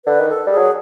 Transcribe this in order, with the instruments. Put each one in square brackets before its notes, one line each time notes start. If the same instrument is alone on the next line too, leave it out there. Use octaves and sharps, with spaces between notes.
[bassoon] D3 [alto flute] B4
[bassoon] D#3
[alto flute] A4
[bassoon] G3 [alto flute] G#4
[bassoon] F#3